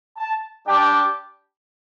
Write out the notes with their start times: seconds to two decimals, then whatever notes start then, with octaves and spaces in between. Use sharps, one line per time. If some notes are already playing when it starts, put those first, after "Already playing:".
0.18 A5
0.67 G3 D4 G4 G5